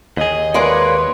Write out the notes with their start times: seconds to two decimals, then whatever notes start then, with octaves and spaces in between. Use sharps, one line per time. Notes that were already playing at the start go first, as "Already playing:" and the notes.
0.17 D#2 G#4 D#5
0.54 G#3 A#3 B4 C#5 D5 G#5 C6